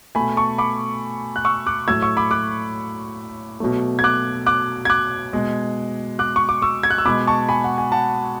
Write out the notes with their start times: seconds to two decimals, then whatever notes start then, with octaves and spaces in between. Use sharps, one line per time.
0.15 B2 A3 G#5 B5
0.37 A5 C#6
0.58 B5 D6
1.36 F#6
1.45 C#6 E6
1.66 D6 F#6
1.88 A2 F#3 A3 E6 G#6
2.02 C#6 E6
2.17 B5 D6
2.31 D6 F#6
3.60 B2 F#3 A3
3.99 G#6
4.04 D6 F#6
4.46 D6 F#6
4.85 G#6
4.90 D6 F#6
5.33 B2 G#3
6.19 D6 F#6
6.36 C#6
6.49 D6
6.62 C#6 E6
6.83 G#6
6.90 F#6
6.98 E6
7.05 B2 G#3 B5 D6
7.27 A5 C#6
7.49 G#5 B5
7.64 F#5
7.78 G#5
7.92 F#5 A5